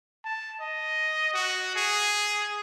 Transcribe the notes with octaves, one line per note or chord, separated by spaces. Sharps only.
A5
D#5
F#4
G#4